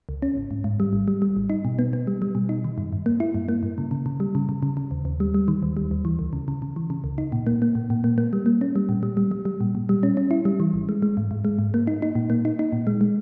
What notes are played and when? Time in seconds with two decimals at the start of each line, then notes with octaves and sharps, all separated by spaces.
0.09 C#2
0.22 C#4
0.37 G#1
0.51 G#2
0.64 G#2
0.80 G3
0.93 G#1
1.08 G3
1.22 G3
1.37 G#1
1.50 D#4
1.65 B2
1.79 B3
1.93 B3
2.07 G3
2.22 G3
2.35 B2
2.49 D#4
2.64 D#3
2.78 G2
2.93 G2
3.06 A#3
3.20 E4
3.35 G2
3.49 A#3
3.63 G2
3.78 C#3
3.91 C#3
4.06 C#3
4.20 G3
4.35 C#3
4.49 C#3
4.63 C#3
4.77 C#3
4.91 D#2
5.05 D#2
5.20 G3
5.34 G3
5.48 D#3
5.63 D#2
5.77 G3
5.91 D#2
6.05 E3
6.19 C#2
6.33 C#3
6.48 C#3
6.62 C#3
6.76 E3
6.90 C#3
7.04 C#2
7.18 D#4
7.32 A#2
7.47 A#3
7.62 A#3
7.75 A#2
7.90 A#2
8.04 A#3
8.18 A#3
8.33 G3
8.46 A#3
8.61 C#4
8.76 G3
8.89 A#2
9.03 G3
9.17 G3
9.31 G3
9.45 G3
9.61 A#2
9.75 A#2
9.89 G3
10.03 C#4
10.17 C#4
10.31 E4
10.45 G3
10.60 E3
10.74 G#1
10.89 G#3
11.02 G#3
11.17 G#2
11.31 G#2
11.45 G#3
11.59 G#2
11.74 A#3
11.87 D#4
12.02 D#4
12.15 A#2
12.30 A#3
12.45 D#4
12.59 D#4
12.72 A#2
12.87 G#3
13.01 G#3